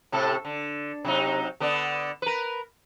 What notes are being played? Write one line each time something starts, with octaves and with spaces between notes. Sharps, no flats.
A2 C3 A4
D3
C3 F#3 D#4
D3 B3 D4
A#4 B4